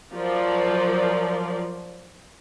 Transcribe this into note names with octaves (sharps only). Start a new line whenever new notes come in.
F3 F#3 F4 A#4 D5